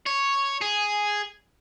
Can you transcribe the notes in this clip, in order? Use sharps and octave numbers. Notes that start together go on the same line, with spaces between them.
C#5
G#4